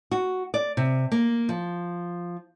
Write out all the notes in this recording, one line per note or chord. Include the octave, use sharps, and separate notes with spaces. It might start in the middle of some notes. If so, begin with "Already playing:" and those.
F#4
D5
C3
A#3
F3